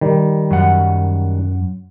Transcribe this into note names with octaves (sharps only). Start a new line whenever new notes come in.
D#3 G3
F#2 F#5